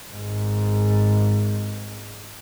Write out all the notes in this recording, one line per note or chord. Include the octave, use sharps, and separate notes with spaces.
G#1 G#2